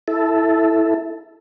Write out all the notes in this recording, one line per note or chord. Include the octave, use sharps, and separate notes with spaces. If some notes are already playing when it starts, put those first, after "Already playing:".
E4 A4